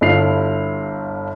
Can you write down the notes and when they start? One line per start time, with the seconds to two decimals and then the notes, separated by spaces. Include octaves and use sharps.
0.01 G1 G2 E4 F4 C7 F7